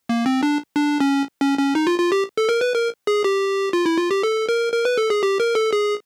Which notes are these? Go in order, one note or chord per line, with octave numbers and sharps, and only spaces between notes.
A#3
C4
D4
D4
C#4
C#4
C#4
D#4
F4
F4
G4
A4
A#4
B4
A#4
G#4
G4
F4
E4
F4
G4
A4
A#4
A#4
B4
A4
G#4
G4
A#4
A4
G#4